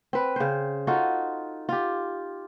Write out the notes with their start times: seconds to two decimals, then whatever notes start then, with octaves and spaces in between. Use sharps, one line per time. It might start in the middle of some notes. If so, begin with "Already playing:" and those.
0.13 C4 B4
0.36 C#3 C5
0.87 D#4 F4 F#4 A4
1.69 F4 G4